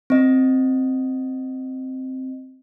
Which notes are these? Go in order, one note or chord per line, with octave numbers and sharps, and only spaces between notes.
C4 D#5